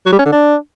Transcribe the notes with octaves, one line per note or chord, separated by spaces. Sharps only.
F#3
G3
C#4
D3
D4